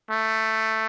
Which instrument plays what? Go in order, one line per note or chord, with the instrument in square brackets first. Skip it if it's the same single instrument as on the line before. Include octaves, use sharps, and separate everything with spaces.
[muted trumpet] A3